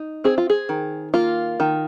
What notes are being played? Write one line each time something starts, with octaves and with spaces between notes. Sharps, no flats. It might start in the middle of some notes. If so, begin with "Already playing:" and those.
Already playing: D#4
C4 G#4
F4
G#4
D#3
A#3 F4
D#3